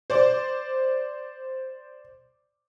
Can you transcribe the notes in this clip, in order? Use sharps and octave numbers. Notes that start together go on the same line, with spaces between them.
C5 D5 D6